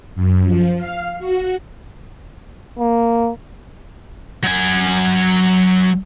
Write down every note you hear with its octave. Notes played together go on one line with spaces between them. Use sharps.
F#2
F3
F5
F#4
A#3
F#3 G#5